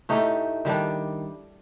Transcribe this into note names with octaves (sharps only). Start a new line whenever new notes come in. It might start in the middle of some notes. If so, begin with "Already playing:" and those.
A2 A3 D#4 G4
D#3 G3 D4